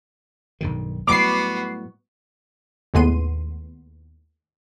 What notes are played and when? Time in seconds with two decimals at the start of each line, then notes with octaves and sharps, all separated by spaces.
0.61 B1 G2 D#3
1.07 A2 F#3 G3 B3 F#4 D6 C7
2.94 D#2 A2 G#3 B3 C6 D#7